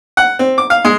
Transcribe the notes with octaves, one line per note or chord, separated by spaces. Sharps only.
F#5
C4
D6
F5
G#3